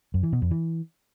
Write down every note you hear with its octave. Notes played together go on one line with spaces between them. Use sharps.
F#2
E3
B2
F2
E3